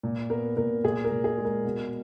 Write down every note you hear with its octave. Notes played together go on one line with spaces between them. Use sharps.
A#2
B3 A#4
A#2 A#4
A#2 G#4
A#4
A#2
G#4
G#3
A#4
B2